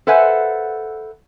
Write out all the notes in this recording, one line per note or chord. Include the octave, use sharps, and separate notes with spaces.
A4 B4 C5 E5 F#5 G#5